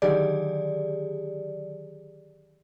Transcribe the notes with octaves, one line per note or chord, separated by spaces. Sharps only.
D3 D#3 F#3 G4 G#4 D5